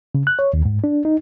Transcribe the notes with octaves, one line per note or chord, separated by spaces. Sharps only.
C#3
F#6
C#5
D#2
G#2
D4
D#4